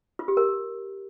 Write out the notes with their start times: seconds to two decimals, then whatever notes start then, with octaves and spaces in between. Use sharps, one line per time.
0.19 F4
0.28 G4
0.37 A#4